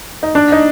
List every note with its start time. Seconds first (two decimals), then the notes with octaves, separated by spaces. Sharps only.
0.23 D#4
0.35 D4
0.52 D#4